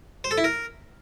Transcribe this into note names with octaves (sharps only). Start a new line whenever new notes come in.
C5
A4
E4
A#4